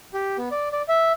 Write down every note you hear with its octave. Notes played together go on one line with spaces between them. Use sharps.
G4
B3
D5
D5
E5